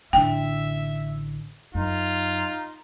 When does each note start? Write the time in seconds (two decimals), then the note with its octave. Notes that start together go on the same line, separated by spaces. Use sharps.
0.13 A1 D3 E5 G5
1.75 F#2 D#4 F4